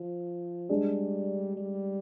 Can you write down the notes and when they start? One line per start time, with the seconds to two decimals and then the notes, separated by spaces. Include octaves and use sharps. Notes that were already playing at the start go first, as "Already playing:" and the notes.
Already playing: F3
0.69 G3 G#3 D4 G#4
1.57 G3